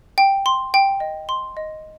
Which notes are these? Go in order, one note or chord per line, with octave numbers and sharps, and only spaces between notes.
G5
C6
G5
D#5
C6
D#5